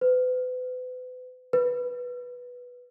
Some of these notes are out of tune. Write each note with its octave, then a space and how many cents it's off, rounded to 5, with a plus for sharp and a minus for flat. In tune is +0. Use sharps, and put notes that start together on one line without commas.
B4 +35
B4 -5